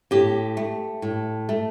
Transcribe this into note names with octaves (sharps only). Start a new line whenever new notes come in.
A2 G4
A3
A2
A3